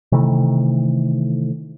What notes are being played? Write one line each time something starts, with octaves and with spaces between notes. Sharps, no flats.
C3 D#3 E3 A3